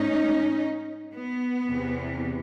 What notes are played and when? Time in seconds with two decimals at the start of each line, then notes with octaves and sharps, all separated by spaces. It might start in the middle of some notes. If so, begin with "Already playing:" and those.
Already playing: G#2 E3 A3 C#4 D#4
1.13 B3
1.67 E2 C3 E3